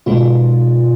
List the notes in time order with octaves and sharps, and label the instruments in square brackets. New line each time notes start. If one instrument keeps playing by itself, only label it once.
[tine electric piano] B2 [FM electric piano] D#3 G#3 B3 F4